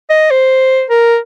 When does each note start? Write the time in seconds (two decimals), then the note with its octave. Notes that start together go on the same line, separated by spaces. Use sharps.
0.10 D#5
0.31 C5
0.90 A#4